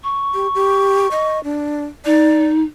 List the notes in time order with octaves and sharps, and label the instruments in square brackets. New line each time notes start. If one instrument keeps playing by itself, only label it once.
[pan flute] C#6
[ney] G4
G4
D#5
D4
[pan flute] D#4 [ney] D5